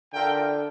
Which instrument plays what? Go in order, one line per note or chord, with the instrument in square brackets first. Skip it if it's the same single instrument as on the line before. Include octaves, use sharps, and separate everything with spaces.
[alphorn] D3 [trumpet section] F4 A#4 E5 G5